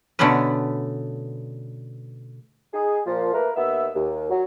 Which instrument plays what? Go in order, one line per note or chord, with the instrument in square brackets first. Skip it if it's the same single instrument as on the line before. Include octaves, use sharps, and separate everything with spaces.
[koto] B2 D3 A3 B3 C#4 B4
[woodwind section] D#4 G#4
A#2 F3
A3 A#3 A#4 B4
D#2 B3 E5
D#2
F#3